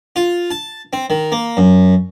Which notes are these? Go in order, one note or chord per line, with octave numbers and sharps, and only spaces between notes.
F4
A5
C4
D#3
A#3
F#2